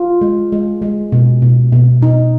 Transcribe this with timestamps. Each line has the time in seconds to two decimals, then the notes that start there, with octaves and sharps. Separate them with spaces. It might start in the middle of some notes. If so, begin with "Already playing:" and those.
Already playing: F4
0.21 G#3
0.52 G#3
0.82 G#3
1.12 B2
1.42 B2
1.72 B2
2.02 B2 D#4